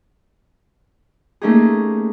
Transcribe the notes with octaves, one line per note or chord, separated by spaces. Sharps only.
A3 A#3 C#4 D#4 G4 G#4